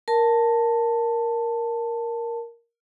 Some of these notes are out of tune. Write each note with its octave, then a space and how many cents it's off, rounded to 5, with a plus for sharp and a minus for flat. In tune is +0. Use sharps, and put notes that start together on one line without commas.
A#4 +0 A5 +10